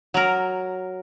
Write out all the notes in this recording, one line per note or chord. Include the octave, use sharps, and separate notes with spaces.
F#3 A#4